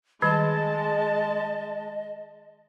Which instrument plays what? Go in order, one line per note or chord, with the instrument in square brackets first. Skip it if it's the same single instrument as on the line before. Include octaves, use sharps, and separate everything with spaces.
[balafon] D#3 G3 [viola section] G#3 A5 [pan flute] D#5